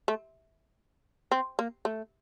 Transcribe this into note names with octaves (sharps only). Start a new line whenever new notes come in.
A3
C4
A#3
A3